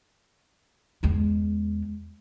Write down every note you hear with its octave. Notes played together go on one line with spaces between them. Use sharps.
E2 G#3